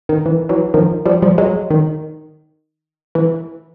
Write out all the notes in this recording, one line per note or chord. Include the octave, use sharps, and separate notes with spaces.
D#3
E3
E3 F#3
D#3 F3
F3 G3
F3 G3
F#3 G#3
D#3
E3